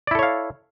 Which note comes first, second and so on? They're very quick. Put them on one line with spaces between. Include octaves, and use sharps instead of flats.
D5 E4 A4 C#5 F5